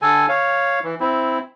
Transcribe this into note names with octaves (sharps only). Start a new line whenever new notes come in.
D3 A4 G#5
C#5 F5
E3
C4 E4